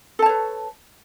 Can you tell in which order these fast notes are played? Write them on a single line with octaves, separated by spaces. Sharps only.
A4 A5 C#5 B4